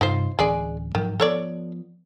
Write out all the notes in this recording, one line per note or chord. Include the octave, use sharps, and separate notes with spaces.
G2 C3 D#4 F4 C5
D1 E3 G#3 C#4 G#4 D5
G#2 D#3 F3 F#3
F3 B3 A4 C#5 D5